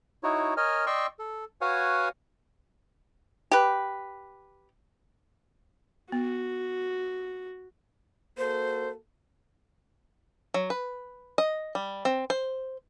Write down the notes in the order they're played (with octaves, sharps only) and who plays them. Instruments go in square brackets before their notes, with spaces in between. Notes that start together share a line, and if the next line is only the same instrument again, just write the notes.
[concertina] D#4 E4 F#4 C#5
A#4 C#5 D#5 G#5 F6
D5 D#5 G5 C6 C#6 E6
A4
F#4 B4 C#5 F5 F#5 G#5
[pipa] G4 B4
[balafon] B3 [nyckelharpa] F#4
[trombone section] A#3 F#4 A4 [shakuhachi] C5
[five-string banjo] F#3
B4
D#5
G3
C4
C5